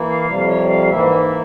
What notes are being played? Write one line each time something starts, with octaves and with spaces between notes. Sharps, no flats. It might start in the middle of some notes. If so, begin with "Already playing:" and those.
Already playing: E3 A#3 E4
F5
F2 C3 G3 F5
C#5
F5
G#2 E3 A#3 E4 E5
E5
E5